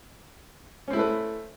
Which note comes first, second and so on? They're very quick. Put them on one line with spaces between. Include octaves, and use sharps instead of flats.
C#4 C4 E4 A3 B4